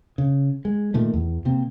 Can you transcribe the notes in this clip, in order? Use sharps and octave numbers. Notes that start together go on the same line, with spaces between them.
C#3
G#3
A#2 D#3 A3
E2
C3 A#3 C4